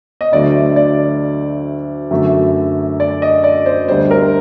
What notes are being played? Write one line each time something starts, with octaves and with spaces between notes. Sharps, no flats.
D#5
D2 D3 F#3 A3 D5
D5
F#2 D3 F#3 A3
D5
D#5
D5
C5
D2 D3 G3 C5
A#4